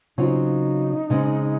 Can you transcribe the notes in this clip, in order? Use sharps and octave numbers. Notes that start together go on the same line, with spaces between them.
C#3 F#3 C4 D#4 F4
C#3 G#3 C4